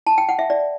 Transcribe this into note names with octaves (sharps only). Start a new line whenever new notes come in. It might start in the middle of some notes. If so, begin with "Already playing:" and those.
A5
G5
F#5
E5
D5